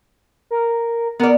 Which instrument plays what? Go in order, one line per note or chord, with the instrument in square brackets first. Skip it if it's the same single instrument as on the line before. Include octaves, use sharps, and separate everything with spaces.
[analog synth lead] A#4
[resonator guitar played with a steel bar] B3 D5 [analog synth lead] A#4